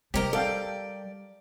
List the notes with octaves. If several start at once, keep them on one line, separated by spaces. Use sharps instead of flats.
C3 G3 G4 A#4 C#5 D#5
A4 D5 F5 G5